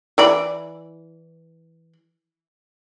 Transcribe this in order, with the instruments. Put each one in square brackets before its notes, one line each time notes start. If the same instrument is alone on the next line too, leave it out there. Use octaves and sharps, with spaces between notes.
[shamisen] E3 D5 B5